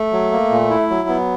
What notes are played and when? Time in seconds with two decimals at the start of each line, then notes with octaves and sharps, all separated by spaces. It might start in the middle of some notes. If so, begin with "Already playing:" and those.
Already playing: A3
0.13 F#3
0.32 A#3
0.51 A#2
0.70 E4
0.90 F#3
1.09 B3